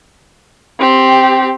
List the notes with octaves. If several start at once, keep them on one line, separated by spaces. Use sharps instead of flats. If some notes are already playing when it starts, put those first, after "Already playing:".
C4 G4